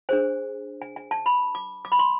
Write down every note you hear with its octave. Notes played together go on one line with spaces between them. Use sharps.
D4 G#4 C5 G#5
G#5
G#5
A5
B5
D6
D6
B5
C6